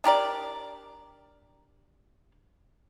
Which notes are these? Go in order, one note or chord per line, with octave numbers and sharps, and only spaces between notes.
D4 G4 A#4 D5